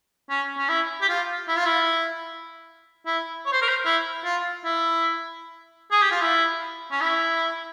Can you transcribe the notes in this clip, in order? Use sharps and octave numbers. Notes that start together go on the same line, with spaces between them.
C#4
C#4
E4
G4
F4
E4
F4
E4
E4
C#5
C5
A#4
C5
E4
F4
E4
G#4
G4
F4
E4
C#4
E4